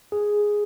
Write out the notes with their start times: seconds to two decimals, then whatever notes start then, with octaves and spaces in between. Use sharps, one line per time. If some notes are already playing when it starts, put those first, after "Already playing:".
0.12 G#4